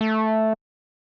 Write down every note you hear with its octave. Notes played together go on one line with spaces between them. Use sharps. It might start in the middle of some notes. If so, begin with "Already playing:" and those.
A3